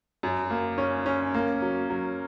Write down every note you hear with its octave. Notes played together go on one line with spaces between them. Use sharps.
F#2
A#3
C#4
C#4
A#3
F#3
F#3